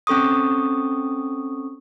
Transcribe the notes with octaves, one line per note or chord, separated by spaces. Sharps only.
C4 C#4 A4 C#6 D#6